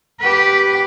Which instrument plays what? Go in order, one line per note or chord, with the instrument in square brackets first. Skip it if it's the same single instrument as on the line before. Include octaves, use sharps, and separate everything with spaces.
[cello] G4 B4